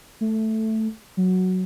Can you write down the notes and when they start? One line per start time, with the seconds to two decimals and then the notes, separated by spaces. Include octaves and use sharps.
0.21 A3
1.17 F#3